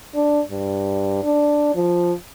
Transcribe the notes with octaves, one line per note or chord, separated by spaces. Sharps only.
D4
G2
D4
F3